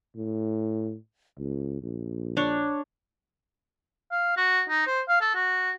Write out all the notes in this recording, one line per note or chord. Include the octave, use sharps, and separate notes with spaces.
A2
C#2
A#1
D4 C#5
F5
F#4
D#4
C5
F5
A4
F#4